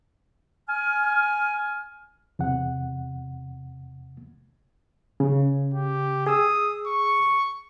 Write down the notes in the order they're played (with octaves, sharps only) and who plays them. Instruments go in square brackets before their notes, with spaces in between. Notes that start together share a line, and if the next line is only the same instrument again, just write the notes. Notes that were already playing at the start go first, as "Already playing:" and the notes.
[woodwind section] G#5 F6
[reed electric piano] E2 C3 F#5
C#3
[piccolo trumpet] G4
[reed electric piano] G#4 E6 [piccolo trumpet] D#6
[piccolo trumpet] C#6